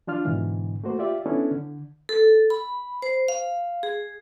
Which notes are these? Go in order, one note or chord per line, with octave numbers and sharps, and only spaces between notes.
F3 D4 F4 F6
G#2 B2 D3 E3
A3 A#3 F#4 C5
F4 G4 D5 E5
B3 C#4 D4 E4 A4
D3
A4
B5
C5
F5
G#4